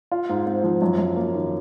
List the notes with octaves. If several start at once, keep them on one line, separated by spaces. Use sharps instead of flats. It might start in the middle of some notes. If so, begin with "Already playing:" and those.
F4
G#2
C4
F3
F#2
F#2
A#3
D#3